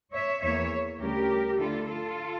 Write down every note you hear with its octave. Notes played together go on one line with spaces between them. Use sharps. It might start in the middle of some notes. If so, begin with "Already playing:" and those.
C#5 E5
E2 E3 A#3 C#5 E5
D2 C#3 G3 C#4 G4 A#4
D3 A3 E4 F4 A4
F4 A4